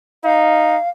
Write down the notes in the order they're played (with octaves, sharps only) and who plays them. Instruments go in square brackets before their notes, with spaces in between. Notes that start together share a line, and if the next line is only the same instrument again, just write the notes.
[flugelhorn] D#4 [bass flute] F5